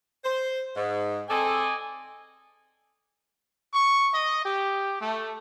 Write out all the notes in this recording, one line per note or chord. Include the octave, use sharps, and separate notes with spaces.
C5
G#2
C4 A4 D5 D#5 G#5
C#6
D#5
G4
A3